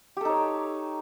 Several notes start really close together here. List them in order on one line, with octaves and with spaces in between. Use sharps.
G4 A4 D#4 C#5